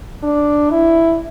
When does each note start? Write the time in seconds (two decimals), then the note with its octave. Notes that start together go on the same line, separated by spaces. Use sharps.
0.23 D4
0.70 E4